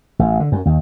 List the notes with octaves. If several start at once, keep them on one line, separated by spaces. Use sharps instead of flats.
A1
D3
F#2
D#2